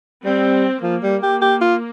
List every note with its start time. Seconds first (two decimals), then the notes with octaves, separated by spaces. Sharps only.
0.24 G3 C4
0.83 F3 A#3
1.03 G3
1.23 G4
1.42 G4
1.61 F4